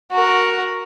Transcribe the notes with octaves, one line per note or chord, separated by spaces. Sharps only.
F#4 A#4